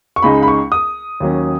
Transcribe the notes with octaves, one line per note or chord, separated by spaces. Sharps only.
C#6
C#2 C#3 G#3 D#4 B5
B5
C#6
D#6
D#2 D#3 F#3 C#4